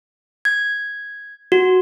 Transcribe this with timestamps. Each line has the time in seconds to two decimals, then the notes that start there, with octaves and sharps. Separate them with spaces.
0.45 G#6
1.52 F#4